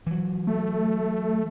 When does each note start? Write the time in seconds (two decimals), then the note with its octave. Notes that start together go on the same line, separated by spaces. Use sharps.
0.07 E3 F#3
0.47 A3